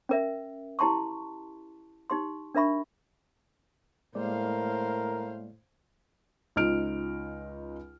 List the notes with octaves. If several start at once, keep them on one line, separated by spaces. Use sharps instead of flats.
C#4 A#4 E5
E4 G4 A5 C6 C#6
D#4 G4 C6
D4 A#4 E5 B5 C#6
A2 G#3 A#3 A#4 C5 D5 F5
C#2 D#4 F4 F6 D7